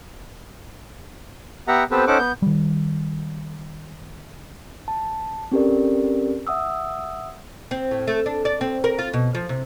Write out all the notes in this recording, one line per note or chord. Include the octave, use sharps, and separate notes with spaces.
B3 G4 E5 F#5 A#5
B3 C4 G4 A4 B4 C5
C#4 D#4 A4 C5 F#5 D6
B3 G6
D#3 G3
A5
C4 C#4 G4 A4 A#4 D5
E5 F#5 D#6 E6
C4
A2
A3
D4
D5
C4
A#4
F4
B2
F3
C3